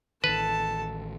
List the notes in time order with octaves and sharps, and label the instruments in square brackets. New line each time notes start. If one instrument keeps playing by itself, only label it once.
[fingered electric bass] A1 D#3 [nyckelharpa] A4 A5 [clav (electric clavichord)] B4